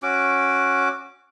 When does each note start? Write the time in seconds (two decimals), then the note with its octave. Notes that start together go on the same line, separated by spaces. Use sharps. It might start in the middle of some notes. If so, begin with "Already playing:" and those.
0.03 C#4 F#4 D6